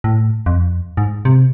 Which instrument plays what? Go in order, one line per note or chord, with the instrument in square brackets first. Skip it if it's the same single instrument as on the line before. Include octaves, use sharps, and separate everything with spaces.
[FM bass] A2
F2
G#2
C3